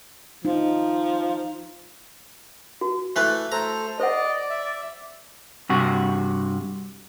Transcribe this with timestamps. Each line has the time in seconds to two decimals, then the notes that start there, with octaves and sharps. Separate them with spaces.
0.45 F3 D#4
2.81 F#4
3.16 E3 A3 B4
3.52 A3 A4 C5 A#5
4.00 C5 D5 D#5 F#5
4.50 E5
5.69 G2 C3 F#4